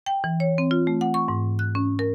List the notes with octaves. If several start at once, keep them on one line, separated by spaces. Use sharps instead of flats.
G5
E3
C#5
C4
F4
A3
F#5
C#6
G#2
F#6
C#4
A#4